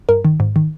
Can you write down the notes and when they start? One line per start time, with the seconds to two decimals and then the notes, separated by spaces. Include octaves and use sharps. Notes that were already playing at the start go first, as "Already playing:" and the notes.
0.09 G2 A#4
0.25 D#3
0.40 G#2
0.56 D#3